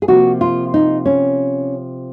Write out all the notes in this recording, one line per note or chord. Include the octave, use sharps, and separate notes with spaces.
G#4
C3 F3 A#3 F#4
F4
D#4
C#4